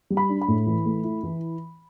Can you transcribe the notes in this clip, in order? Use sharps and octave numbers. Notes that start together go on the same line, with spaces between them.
G3
B5
D4
B5
A2
E3
A3
E4
E3